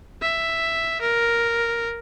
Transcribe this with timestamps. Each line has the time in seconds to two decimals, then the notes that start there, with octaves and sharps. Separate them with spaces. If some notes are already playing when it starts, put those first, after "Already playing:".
0.22 E5
1.02 A#4